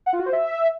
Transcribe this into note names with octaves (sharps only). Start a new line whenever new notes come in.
F#5
F4
F#4
C5
E5